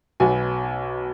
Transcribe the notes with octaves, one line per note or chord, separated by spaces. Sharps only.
B1 B2 F#3 B3 G#5